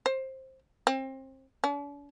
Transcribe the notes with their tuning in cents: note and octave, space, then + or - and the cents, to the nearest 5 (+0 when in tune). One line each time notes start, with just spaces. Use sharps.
C5 +15
C4 +30
D4 -45